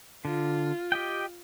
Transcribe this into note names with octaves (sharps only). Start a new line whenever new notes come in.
D3 F4
G4 D#5 G5